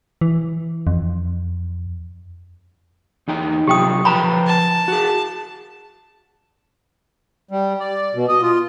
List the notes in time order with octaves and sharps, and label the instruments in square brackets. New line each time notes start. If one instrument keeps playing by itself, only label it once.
[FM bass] E3
F2
[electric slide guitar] E2 D#4 G5
[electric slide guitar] C3 F#3 F4 [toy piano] G4 G5 D#6
[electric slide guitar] F3 B4 G5 [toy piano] A#5 B5
[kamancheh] A5
[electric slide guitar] F#4 G#4
[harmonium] G3
D5
B2
D#5
F4